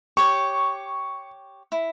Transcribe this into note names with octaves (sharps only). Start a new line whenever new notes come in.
G4 C#5 C#6
E4